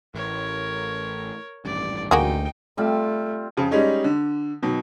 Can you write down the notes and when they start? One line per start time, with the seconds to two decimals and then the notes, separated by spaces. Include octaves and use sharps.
0.15 A1 A2 A#4 C#5
1.65 D#1 A1 G2 D5
2.11 D2 A#3 D#4 F#4 G#4 G5
2.78 G3 A3 C4 F4
3.57 F2 C#3
3.71 G3 G#3 C#4 D#4
4.04 D3
4.62 B2 D#3 F#3